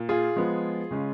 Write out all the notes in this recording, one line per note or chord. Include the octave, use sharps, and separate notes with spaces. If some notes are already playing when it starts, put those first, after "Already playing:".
Already playing: A#2
F4 G#4
F3 G#3 B3
C#3 G#3 C#4